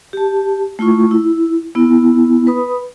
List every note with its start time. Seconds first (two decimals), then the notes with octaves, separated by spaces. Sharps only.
0.13 G4 A5
0.79 A3 E4 F4 C#6
1.11 E4
1.75 B3 E4
2.47 B4 B5 D#6